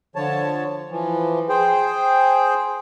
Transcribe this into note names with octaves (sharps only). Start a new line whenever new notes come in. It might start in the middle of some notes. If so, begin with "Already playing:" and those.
D3 F3 C#5 A5
E3 F3
G#4 C5 G5